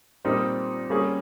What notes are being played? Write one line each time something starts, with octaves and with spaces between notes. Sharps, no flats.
A#2 G3 C4 D#4 A#4
G3 A#3 C#4 G#4